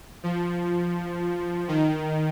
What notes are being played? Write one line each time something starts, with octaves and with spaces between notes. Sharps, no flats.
F3
D#3